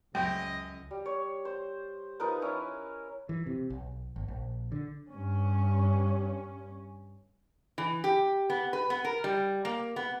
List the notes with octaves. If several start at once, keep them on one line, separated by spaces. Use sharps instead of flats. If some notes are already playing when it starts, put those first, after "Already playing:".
C#2 F#2 D#5 G5
G3
C#5
C5
F3 D#4 A#4 B4
C#4 E4
E3
C3
B1
G#1
A#1
D3
G2 C#4
E3
G4
B3
B4
B3
A#4
G3
A#3
B3